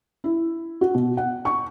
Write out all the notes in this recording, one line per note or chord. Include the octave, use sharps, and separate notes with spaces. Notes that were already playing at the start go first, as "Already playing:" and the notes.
E4
F#4
B2
F#5
C#6